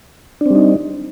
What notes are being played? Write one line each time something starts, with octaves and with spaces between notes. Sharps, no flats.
G3 C4 D4 D#4